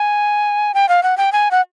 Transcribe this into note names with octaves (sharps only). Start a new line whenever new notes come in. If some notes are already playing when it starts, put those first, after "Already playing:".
Already playing: G#5
G5
F5
F#5
G5
G#5
F#5